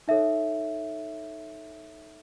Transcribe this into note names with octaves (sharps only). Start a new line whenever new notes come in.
D#4 A4 C#5 E5